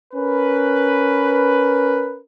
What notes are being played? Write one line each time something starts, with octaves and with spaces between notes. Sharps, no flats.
C#4 A#4 B4